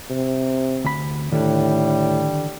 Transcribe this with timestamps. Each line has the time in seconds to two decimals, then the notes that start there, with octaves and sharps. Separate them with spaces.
0.10 C3
0.85 D2 B5
1.32 A2 D3 D#3 G3